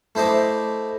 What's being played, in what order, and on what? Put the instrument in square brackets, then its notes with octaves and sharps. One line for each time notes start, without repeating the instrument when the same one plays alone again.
[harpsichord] A3 E4 C5 D#5 D6